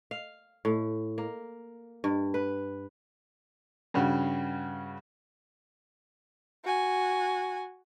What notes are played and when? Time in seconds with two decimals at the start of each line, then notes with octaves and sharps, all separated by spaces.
0.11 F5
0.65 A2
1.18 A#3
2.04 G2
2.34 B4
3.94 G2 C#3 F#4
6.65 F#4 G#5